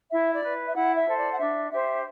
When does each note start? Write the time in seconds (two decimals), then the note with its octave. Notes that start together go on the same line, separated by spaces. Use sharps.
0.12 E4 E5
0.33 D5
0.44 B4
0.67 E5
0.75 E4 F#5
0.97 E5
1.07 A4 C5
1.18 D5
1.32 F#5
1.38 D4 E5
1.71 G4 C5 E5